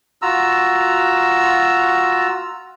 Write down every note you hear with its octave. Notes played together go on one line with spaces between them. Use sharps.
F4 F#4 A#5 E6